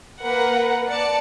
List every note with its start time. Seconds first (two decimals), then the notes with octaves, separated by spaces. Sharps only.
0.22 A#3 A#4 B4 F#5
0.89 D5 A5 C#7